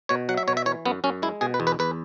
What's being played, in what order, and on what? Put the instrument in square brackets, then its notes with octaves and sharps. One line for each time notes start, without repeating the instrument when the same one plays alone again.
[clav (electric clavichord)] B2 C#5
F#3 F#5
E5
B2 C#5
E5
E3 C#5
F#2 B3
F#2 C#4
G#3 E4
B2 G#4
B4
E2
B4
E2 B4